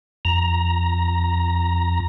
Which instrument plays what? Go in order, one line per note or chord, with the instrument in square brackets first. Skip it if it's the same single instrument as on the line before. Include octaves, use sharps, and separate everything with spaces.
[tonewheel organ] F2 A#5